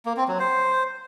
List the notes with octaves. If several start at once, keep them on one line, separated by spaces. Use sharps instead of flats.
A#3
C4
F#3
C5